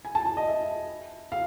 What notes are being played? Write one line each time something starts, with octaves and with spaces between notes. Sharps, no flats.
G#5
A5
A5
D#5
E5
F5